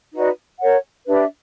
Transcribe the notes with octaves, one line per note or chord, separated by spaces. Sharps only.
D#4 F#4 B4 D5
A#4 C#5 F#5
D4 G4 B4 E5